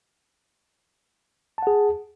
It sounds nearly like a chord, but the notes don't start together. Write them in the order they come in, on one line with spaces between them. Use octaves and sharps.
A5 F#5 G#4